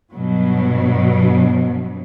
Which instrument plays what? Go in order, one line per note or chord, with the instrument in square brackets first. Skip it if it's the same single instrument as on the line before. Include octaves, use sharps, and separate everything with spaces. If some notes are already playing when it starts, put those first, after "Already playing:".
[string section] G2 B2 F#3